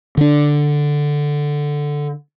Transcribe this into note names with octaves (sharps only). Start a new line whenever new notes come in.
D3 D4